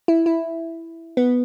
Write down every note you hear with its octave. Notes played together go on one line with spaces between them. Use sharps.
E4
E4
B3